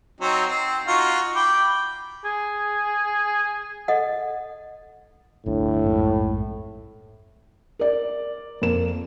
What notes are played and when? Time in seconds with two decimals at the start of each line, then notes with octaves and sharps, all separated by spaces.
0.21 F#3 C4 D#4
0.48 C4
0.88 D#4 F4 F#4
1.35 G5 B5 D6
2.25 G#4
3.88 A4 D#5 F#5
5.46 G1 D2 A2 D4
5.86 A#1 F2 G#2
7.79 A#4 D5
8.62 F2 A#3 E7